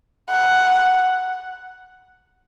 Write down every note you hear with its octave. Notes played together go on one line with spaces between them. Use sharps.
F#5